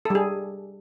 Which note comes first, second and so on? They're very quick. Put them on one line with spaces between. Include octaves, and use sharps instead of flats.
A4 G3 G#4